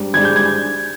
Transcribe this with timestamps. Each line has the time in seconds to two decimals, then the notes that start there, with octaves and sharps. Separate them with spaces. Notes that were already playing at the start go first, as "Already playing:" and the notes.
Already playing: G#2 G3 D4
0.14 G#2 G3 D4 G#6
0.25 G6
0.36 G#6